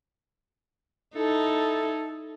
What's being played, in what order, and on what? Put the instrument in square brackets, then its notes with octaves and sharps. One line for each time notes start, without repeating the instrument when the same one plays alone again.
[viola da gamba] D#4 [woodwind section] E4 A4